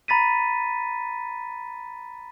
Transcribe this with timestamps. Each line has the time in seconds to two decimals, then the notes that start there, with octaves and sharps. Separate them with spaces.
0.08 A#5 B5 A6 B6 D#7